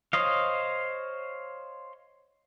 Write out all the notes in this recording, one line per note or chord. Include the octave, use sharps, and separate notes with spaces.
C5 C#5 D#5 F5